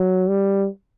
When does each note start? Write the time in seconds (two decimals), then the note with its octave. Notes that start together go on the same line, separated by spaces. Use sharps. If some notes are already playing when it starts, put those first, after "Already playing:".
Already playing: F#3
0.29 G3